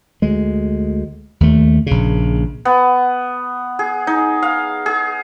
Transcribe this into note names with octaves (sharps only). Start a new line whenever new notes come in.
D2 G#3
D#2 A3
A#1 C#3
B3
G#4
D#4
F5
G#4